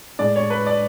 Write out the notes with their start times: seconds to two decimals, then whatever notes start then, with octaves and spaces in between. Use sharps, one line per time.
0.19 A2 G#3 D4 D5
0.36 C#5
0.50 B4
0.66 D5